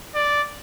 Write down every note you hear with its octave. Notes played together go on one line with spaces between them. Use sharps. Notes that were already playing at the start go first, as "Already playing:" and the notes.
D5